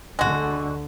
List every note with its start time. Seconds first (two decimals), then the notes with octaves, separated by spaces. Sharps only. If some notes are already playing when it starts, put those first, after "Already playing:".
0.19 D2 D3 G#3 F#4